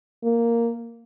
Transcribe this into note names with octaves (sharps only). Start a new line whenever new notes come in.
A#3